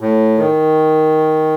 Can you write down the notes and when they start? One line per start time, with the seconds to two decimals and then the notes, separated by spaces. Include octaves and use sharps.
0.01 A2
0.38 D#3